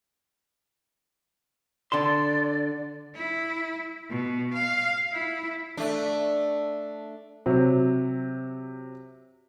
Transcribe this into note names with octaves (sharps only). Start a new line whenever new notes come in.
D3 D5 A5 C6
E4
B2
F5
E4
A3 D4
C3 F#3